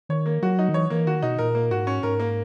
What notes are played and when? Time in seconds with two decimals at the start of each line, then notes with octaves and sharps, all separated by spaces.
0.09 D#3 C#5
0.26 A#3
0.42 F#3 F#4
0.59 D#4
0.69 D#3
0.74 E3 C#5
0.90 E3 A#3
1.06 D#3 F#4
1.22 B2 D#4
1.39 A#2 A#4
1.55 A#3
1.71 G#2 F#4
1.87 C#4
2.03 G#2 A#4
2.20 A#3